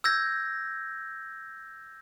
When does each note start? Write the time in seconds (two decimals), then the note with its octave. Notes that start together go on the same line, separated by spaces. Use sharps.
0.04 E6 G6 G#6 A#6